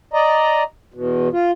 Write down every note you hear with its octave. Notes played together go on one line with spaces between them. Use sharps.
D5 D#5 A#5
E2 B2
F4